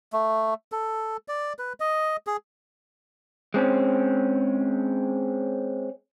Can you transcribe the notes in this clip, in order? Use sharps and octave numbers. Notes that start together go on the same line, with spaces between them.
A3
A4
D5
B4
D#5
G#4
G#3 C4 C#4